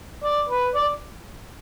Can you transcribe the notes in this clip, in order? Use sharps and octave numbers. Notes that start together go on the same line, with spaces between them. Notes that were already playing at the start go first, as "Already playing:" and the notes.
D5
B4
D5